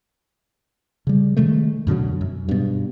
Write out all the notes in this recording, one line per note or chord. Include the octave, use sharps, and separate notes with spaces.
C#3 G3
C3 D#3 G#3 A3
F#2 B2 D3 F#3
F#2
G2 B2